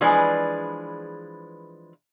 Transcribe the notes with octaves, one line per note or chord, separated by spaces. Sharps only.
E3 F3 G#3 D4 G#4 B4